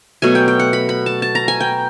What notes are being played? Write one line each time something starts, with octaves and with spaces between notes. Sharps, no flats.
B2 F#3 A3 G#5
G5
G5
F#5
B5
B5
A5
A5
A#5
G#5
G5